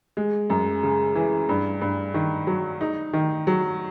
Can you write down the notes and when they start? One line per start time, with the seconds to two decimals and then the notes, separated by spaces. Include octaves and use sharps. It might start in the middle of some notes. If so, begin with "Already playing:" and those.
0.17 G#3
0.50 F#2
0.83 C#3
1.15 E3
1.49 G2
1.82 G2
2.14 D#3
2.47 F#3
2.81 D#4
3.13 D#3
3.47 F#3